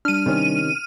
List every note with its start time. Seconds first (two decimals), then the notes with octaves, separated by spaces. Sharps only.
0.05 G3 D4 F6 D#7
0.26 C3 D#3 C#4